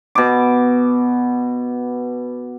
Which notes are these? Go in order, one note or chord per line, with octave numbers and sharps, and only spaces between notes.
B2 D6